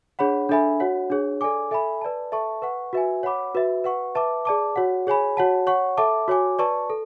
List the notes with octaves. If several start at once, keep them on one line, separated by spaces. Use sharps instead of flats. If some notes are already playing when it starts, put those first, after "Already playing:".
D4 G#4 C#5 F#5 B5
D4 A4 E5 G#5 B5
F#4 C#5 F#5
D4 G#4 C#5
A4 D5 G#5 D6
A4 E5 G#5 B5
B4 D5 A5
A4 E5 A5 C#6
B4 F#5 C#6
F#4 B4 E5 G#5
C#5 F#5 B5 D6
F#4 B4 E5
B4 F#5 C#6
B4 E5 A5 D6
G#4 D5 A5 D6
F#4 C#5 F#5
G#4 C#5 G#5 B5
F#4 C#5 F#5 A5
C#5 F#5 C#6
A4 E5 A5 D6
F#4 C#5 G#5 D6
B4 D5 A5 C#6
A4